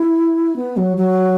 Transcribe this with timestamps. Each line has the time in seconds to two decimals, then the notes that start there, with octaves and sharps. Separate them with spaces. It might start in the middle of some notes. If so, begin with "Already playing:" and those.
Already playing: E4
0.56 B3
0.77 F#3
0.97 F#3